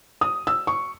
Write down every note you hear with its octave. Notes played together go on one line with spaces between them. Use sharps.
D#6
E6
C#6